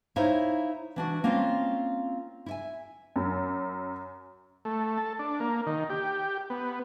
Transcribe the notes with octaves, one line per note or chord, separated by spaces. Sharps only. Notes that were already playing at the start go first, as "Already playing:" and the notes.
D#4 E4 C5 C#5 E5 F5
E3 D4 F#4
A#3 C4 C#4 F4
E4 E5 G#5
F#2
A3
A4
D4
A#3
D#3
G4
B3